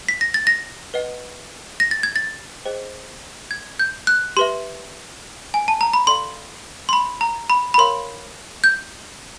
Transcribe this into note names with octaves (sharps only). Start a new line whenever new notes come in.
B6
A#6
A6
A#6
B4 D#5 F#5
A#6
A6
G#6
A6
G#4 C5 D#5 G5
G#6
G6
F#6
G4 B4 E5 C6
G#5
A5
A#5
B5
A4 D5 F5 C6
C6
B5
A#5
B5
B5
A#4 C#5 F5 C6
G6